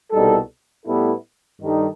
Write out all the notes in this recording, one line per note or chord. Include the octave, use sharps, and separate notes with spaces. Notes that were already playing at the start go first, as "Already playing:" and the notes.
C2 B2 G3 D#4 A4
A2 G3 B3 E4 A4
G2 D#3 G3 D#4 A4